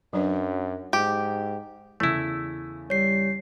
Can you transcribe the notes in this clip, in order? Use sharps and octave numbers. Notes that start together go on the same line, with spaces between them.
F#2 F#3 D4 B4
G#2 G4
E2 C#3 A3 E4
G3 C#5 C7